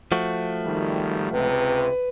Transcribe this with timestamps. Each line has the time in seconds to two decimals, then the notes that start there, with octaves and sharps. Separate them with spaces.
0.12 F3 A3 F#4
0.64 G#1 D#3 G3
1.32 C#2 C3 B4